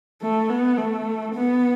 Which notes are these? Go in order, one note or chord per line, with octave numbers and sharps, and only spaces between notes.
A3
B3
A3
B3